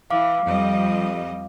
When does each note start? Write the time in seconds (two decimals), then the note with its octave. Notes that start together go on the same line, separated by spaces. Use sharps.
0.10 E3 F5 D6
0.47 F2 G3 D#5